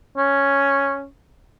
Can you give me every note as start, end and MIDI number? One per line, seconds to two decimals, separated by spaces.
0.17 1.06 61